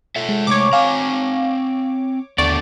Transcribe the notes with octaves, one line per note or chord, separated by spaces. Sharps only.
F4 A4 E5
G#3
C3 A3 C#5 D6
C4 F5 G#5 A#5
D#2 D3 A3 B3 D5 C#6